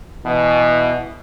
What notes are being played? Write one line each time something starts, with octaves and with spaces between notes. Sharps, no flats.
B2 E3